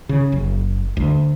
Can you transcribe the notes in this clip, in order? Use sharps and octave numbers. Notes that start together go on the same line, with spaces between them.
C#3
F#1
D2